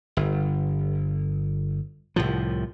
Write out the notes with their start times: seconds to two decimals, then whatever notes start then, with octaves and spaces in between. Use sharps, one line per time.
0.17 G1
2.16 C2 A2 F3